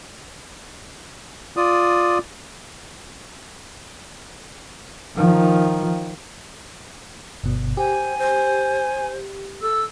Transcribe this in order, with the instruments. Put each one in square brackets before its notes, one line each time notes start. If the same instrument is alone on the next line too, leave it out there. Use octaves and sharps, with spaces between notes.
[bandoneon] F4 D5 D#6
[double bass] D#3 F3
[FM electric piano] G1 B2
[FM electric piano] G4 [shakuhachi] C5 [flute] G#5
[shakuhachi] C5
[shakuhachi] A4 [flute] E6